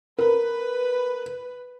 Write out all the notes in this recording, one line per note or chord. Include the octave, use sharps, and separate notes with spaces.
A#4 B4